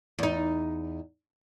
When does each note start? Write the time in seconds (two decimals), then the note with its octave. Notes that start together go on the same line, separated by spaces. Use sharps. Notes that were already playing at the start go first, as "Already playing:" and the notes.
0.19 E2 D#4